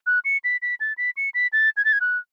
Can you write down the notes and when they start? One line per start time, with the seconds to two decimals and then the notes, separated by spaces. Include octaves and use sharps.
0.06 F#6
0.25 C#7
0.44 B6
0.62 B6
0.80 A6
0.97 B6
1.17 C#7
1.34 B6
1.53 A6
1.77 G#6
1.85 A6
1.93 G#6
2.01 F#6